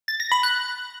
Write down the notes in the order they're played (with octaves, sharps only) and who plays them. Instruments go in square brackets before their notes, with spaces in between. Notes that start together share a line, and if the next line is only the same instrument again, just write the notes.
[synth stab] A6
A#6
B5
F#6